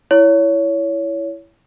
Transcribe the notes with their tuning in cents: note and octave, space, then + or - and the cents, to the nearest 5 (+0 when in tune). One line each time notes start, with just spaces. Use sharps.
E4 +10 C#5 +20